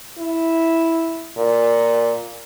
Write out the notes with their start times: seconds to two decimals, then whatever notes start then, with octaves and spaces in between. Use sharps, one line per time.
0.18 E4
1.37 A#2